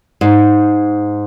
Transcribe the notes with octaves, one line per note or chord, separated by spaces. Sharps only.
G#2